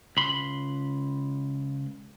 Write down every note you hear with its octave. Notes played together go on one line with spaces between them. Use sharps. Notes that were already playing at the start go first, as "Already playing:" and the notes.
C#2 B5 C6